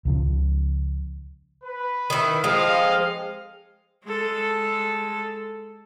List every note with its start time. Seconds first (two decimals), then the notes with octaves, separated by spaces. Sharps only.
0.05 C#2 C#3 F3
1.64 B4
2.10 D#3 E4
2.44 F3 G#3 C4 A4 D#5 F5
4.06 G#3 A4